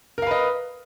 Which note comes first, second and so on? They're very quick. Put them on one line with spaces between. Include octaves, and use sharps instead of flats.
A#4 F5 B4 D#5